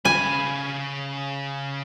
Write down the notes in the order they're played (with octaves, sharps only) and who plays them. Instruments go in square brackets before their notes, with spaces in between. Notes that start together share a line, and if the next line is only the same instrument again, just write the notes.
[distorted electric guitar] C#3 B5 [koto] G#5